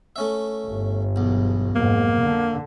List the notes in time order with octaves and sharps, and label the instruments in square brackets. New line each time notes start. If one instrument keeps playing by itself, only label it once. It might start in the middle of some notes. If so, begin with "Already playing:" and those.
[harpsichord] A3 C#4 E5
[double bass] G1
[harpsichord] B1 E2
[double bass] F2 G#2 [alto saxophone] A#3
[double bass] D3